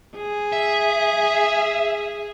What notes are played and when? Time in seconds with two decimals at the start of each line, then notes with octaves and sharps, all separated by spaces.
0.17 G#4
0.53 E5